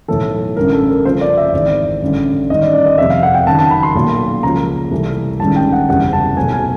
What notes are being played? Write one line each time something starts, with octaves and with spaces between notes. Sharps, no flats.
B1 A2 E3 A4
A1 G2 D3 A#4
A4
A#4
F2 C#3 F3 A3 C5
D5
E5
G#1 G#2 E3 D5
A1 G2 D3
A1 G2 D#3 D#5
D5
D5
D#5
F1 F2 C3 E5
F5
F#5
G5
F#1 F#2 D#3 A5
A5
B5
C6
B1 A#2 F#3 A#3
C#2 C#3 F3 A#3 A#5
C2 C3 E3 A3
A1 G2 D#3 G#3 A5
G5
F#5
F#1 E2 C3 E3 G3 F#5
A5
B1 B2 F#3 A3 C4 G#5
G#5